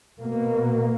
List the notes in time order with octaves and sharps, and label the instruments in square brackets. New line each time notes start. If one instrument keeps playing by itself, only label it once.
[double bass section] B2 A#3